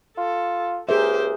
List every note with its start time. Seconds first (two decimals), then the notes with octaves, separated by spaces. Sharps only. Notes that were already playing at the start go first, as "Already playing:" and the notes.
0.18 F4 A4
0.89 C#2 G4 G#4 A#4 C5 E5